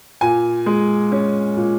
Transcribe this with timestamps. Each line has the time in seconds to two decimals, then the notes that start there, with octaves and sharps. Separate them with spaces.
0.21 A#2 G#5
0.66 G#3
1.12 C#4
1.57 A#2